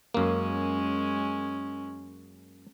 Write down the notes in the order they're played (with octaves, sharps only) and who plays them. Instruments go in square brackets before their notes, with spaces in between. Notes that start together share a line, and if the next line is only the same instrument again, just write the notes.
[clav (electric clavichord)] F#2 A#3 [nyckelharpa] G#3 C#4